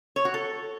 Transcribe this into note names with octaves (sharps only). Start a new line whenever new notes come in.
C#5
F#4
A4